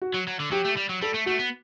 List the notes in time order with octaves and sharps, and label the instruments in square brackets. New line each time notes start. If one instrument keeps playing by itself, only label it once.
[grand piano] F#4
[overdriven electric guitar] F#3
F#3
D3
[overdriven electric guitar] F#3 [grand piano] G4
[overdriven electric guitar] A3
G3
F#3
[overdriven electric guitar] G3 [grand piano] A4
[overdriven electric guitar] A3
[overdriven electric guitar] A3 [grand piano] F#4
[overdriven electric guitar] B3